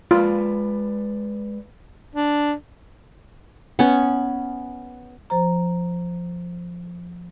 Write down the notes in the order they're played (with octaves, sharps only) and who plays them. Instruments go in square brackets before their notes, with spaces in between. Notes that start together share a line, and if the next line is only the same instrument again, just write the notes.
[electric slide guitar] G#3 B4 D5 [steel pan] F4
[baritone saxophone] D4
[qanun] B3 C#4
[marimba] F3 C5 A#5